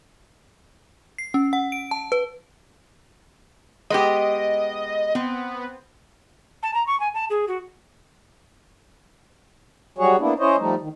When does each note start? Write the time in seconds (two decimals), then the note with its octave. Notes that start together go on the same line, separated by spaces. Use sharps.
1.18 C7
1.34 C#4
1.53 F#5
1.72 D7
1.91 A5
2.12 B4
3.90 G#3 B3 G4 D#5
5.15 B3 C4
6.63 A5
6.74 A#5
6.87 C#6
7.00 G#5
7.14 A5
7.30 G#4
7.48 F#4
9.98 F#3 G3 F#4 G#4 C#5
10.19 A#3 B3 D4 E4
10.39 C#4 E4 C5 C#5 D#5
10.58 F3 G3 A3 D#4
10.81 D#3